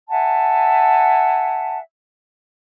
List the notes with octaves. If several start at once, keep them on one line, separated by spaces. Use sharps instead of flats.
E5 F#5 G#5 A5